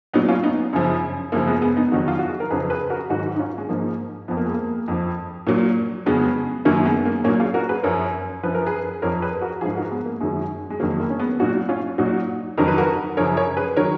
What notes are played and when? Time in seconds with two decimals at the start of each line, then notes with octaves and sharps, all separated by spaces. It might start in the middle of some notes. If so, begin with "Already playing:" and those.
0.13 A#2 F#3 B3 D#4
0.29 C#4 F4
0.43 B3 D#4
0.73 F#2 C#3 F3
1.32 F#2 C#3 F3 A#3
1.47 G#3 B3
1.62 G#3 B3
1.77 B3 D#4
1.91 F2 D#3 F#3 D#4 F#4
2.08 F4
2.19 F#4
2.29 G#4
2.40 A#4
2.50 F2 C#3 F3 G#4 B4
2.70 G#4 B4
2.90 F#4 A#4
3.10 G#2 D#3 F#3 D#4 F#4
3.36 D#4
3.39 C#4 F4
3.58 G#3
3.69 G#2 F3 A#3
4.28 F2 F3 B3
4.37 A#3
4.46 G#3
4.54 A#3
4.88 F2 F3
5.47 A#2 F#3 A#3
6.06 F2 C#3 F#3 G#3 B3
6.65 F#2 D#3 F#3 A#3 C#4
6.85 G#3 B3
7.05 A#3
7.24 A#2 A#3 C#4
7.28 F#3
7.40 F4 G#4
7.54 F#4 A#4
7.69 G#4 B4
7.83 F#2 F3 A#4 C#5
8.43 F#2 F3 B4
8.55 A#4
8.67 G#4 B4
9.02 F2 F3 A#4 C#5
9.22 G#4 B4
9.41 F#4 A#4
9.61 F3 F4 G#4
9.65 G#2
9.77 F#4 A#4
9.91 G#3 B3
10.06 A#3
10.21 F#2 D#3 F#3 G#3
10.70 G#3
10.80 F2 D#3 F#3 A#3
11.00 A#3
11.10 C#4
11.20 G#3 B3
11.40 A#2 F#3 D#4 F#4
11.69 C#4 F4
11.98 A#2 F#3 D#4 F#4
12.58 F2 D#3 F#3 A#4
12.68 B4
12.78 F#4 A#4
13.17 F#2 C#3 F3 A#4 C#5
13.37 A#4 C#5
13.57 G#4 B4
13.76 D#3 F#3 A#4 C#5